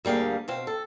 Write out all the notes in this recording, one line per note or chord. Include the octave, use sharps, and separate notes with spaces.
D2 G3 A#3 G#4 F5
B2 C4 F5
A4